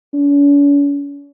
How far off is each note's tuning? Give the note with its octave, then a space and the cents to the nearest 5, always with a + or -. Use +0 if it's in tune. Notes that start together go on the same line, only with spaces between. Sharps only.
C#4 +45